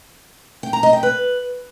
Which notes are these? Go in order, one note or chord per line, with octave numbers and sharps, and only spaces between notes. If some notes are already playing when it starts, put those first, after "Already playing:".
G5
A#5
D#5
G5
B4